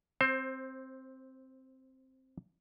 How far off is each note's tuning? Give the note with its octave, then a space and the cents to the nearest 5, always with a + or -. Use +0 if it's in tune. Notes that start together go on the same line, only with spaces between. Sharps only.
C4 +0 C5 +25